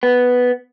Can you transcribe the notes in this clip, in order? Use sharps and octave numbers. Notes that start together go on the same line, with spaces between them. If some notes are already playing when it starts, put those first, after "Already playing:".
B3